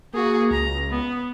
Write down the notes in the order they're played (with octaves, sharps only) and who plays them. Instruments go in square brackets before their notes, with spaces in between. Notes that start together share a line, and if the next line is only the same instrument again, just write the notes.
[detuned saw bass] A#3 [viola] F#4 G#4
[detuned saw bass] C#2 [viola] A#5
[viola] B3